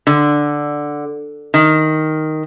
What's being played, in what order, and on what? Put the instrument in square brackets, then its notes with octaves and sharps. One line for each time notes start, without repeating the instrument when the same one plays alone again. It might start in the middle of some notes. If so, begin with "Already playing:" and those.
[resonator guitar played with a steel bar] D3
D#3